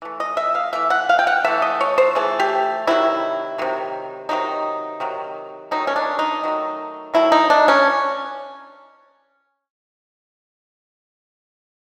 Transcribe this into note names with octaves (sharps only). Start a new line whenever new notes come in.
E3 A3
D#5
E5
F5
E3 A3 E5
F#5
F5
G5
F#5
E3 A3 E5
D#5
C#5
C5
E3 A3 G#4
G4
C3 D#3 F#3 E4
C3 D#3 F#3
C3 D#3 F#3 D#4
C3 D#3 F#3
D#3 F#3 A3 D#4
C#4
D4
D#4
D#3 F#3 A3
D#3 F#3 A3 E4
D#4
D4
C#4